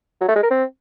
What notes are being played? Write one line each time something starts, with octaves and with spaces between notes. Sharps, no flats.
F#3
A3
G#3
A#4
C4